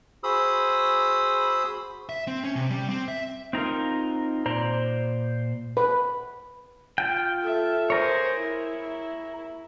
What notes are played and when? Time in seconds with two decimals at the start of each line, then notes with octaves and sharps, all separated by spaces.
0.24 F#4 G#4 C5 B5 D#6 E6
2.09 E5
2.27 C4
2.44 C#4
2.56 C3
2.70 G3
2.89 C4
3.08 E5
3.53 C4 D#4 F4 A#4
4.46 A#2 C5 D5 A#5
5.77 B4
6.98 F4 G5
7.43 A4 E5
7.90 G#4 A#4 C5 C#5
8.42 E4